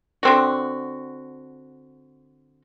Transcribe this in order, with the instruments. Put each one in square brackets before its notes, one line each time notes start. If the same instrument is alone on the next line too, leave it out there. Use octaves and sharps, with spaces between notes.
[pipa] D3 C4 F#4